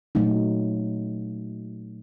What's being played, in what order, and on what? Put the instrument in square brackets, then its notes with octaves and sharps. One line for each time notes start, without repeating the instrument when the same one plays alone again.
[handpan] A#2 F#3 A3 D#4